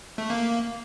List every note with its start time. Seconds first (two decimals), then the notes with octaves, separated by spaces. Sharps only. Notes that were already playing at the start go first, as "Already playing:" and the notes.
0.18 A3
0.30 A#3